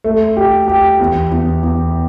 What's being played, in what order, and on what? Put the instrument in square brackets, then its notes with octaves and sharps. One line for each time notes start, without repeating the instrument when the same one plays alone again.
[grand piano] A3
G4
G4
E2
E2
E2